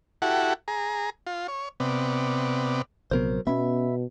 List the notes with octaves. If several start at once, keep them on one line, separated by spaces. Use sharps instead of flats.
E4 F#4 G4 A4 F#5
G#4 A#5
F4
C#5
C3 B3 D5
A#1 C3 F#3 B3 A#4 C5
B2 B3 C#4 E5 B5